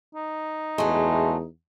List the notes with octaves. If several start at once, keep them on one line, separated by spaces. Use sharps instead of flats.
D#4
E2 F#3 G#3 A3